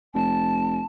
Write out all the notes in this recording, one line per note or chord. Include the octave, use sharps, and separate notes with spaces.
F1 A5